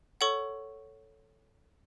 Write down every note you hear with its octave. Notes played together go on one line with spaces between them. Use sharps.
A4 C#5 F#5 C#6